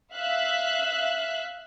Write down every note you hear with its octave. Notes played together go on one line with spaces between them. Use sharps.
E5 F5 F#6